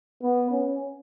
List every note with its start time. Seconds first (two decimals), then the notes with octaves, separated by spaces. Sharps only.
0.22 B3
0.51 C#4